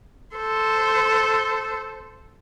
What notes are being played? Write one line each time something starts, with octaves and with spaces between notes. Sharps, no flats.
A4 C5